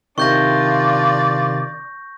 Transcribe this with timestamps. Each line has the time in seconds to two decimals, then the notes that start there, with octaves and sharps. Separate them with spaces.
0.18 C3 D#3 D4 F4 D5 C#6 G6 A#6